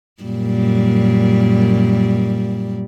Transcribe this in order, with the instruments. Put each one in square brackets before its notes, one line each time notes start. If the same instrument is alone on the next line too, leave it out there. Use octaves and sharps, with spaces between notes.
[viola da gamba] F#2 A#2 G3